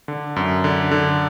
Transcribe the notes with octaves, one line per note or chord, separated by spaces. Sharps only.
D3
F#2
D3
D3